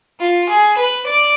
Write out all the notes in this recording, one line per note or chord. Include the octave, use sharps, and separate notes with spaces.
F4
G#4
B4
D5